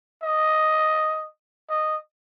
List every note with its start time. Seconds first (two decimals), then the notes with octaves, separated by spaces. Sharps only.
0.23 D#5
1.70 D#5